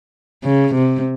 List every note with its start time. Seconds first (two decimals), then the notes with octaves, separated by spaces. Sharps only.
0.44 C#3
0.74 C3